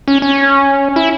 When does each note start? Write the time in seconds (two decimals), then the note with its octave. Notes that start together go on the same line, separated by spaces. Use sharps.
0.08 C#4
0.22 C#4
0.96 E4